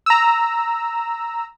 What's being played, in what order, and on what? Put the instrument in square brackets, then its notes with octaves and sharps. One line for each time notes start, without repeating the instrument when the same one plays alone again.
[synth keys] A#5 E6